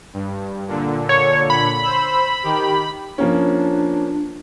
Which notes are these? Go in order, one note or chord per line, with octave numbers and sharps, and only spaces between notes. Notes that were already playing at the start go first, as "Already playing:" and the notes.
G2
A#2 D3
C#5
B5
C5 E6
D#3 G4
F3 A#3 C#4 D4